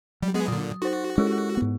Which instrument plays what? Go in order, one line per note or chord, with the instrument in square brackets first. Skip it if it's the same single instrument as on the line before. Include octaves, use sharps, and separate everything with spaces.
[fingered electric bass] F#3 [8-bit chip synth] G3
[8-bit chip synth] G#3 B3 G#4
[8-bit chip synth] A#2 D3 [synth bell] D#6
[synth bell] D#4 C5 [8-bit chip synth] F#4
[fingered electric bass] G#3 C#4 [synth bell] E4 G4 A4
[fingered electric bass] G#2 B3